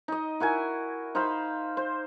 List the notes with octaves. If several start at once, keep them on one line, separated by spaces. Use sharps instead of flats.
D#4 D#5
E4 F#4 A#4 G#5
D#4 C5 F5 B5
C5